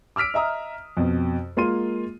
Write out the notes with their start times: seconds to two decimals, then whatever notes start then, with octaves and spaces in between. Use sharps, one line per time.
0.16 D6 E6 F6 B6 D7
0.34 D#5 E5 A#5 D#6
0.97 F2 B2
1.57 G#3 A#3 F4 C6 D#7